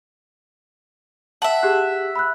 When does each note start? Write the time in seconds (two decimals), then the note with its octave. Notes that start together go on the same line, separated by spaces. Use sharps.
1.42 E5 F#5 A5
1.63 G4 G#4 F#6
2.16 B5 E6 F#6